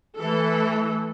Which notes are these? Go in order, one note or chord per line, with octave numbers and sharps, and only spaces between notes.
E3 A3 A4